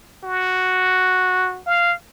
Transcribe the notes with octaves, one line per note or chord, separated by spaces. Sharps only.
F#4
F5